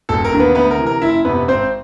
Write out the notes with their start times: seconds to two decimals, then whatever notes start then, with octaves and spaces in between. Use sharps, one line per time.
0.09 E1 A4
0.25 A#4
0.32 D#2 D3
0.40 B3 B4
0.55 D2 B3 B4
0.71 A#4
0.78 C3 E3
0.87 A#4
1.02 F#1 E4 E5
1.25 F2 C3 B3 B4
1.48 G#1 C4 C5